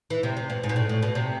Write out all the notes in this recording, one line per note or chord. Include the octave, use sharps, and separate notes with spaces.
E3
C3
C3
B2
G#2
B2
A2
A2
B2
C3